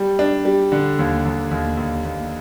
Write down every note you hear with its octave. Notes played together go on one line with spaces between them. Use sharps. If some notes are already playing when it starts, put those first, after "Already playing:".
Already playing: G3
D4
G3
D3
D#2
D#2
D#2
D#2
D#2